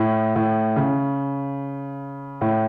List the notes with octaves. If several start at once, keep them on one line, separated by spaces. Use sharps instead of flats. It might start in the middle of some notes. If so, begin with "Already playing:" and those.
Already playing: A2
A2
C#3
A2